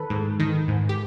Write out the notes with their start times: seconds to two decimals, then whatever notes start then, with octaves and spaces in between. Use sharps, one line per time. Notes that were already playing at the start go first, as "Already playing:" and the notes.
Already playing: D#3 A4 B4
0.10 G#2
0.40 D#3
0.68 G#2
0.89 G4